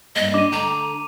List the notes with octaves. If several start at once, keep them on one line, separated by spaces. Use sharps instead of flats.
G2 A#3 D#5
G3 D4 D6 D#7 E7
D3 A3 G5 A#5